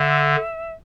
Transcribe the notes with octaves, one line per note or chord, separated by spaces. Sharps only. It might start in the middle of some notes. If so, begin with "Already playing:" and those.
Already playing: D3 E5